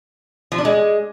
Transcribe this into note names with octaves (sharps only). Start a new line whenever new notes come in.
F3
D4
G#3